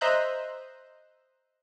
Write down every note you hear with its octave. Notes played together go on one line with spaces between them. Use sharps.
C5 D#5 E5 A#5 F#6 G6